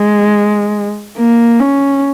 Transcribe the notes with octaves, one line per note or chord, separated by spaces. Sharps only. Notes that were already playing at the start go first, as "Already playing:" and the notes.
Already playing: G#3
A#3
C#4